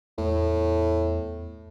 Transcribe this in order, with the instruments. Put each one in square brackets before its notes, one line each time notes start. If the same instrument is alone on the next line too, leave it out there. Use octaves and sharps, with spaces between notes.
[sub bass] E2 [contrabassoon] A2